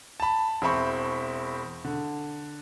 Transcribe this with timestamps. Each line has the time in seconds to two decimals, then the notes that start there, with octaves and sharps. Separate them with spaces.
0.20 A5 B5
0.62 E1 C4 E5 B5 C#6
1.85 D3